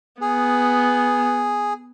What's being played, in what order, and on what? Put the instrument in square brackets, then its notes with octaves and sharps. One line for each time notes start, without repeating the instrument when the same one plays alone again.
[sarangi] B3 [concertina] G#4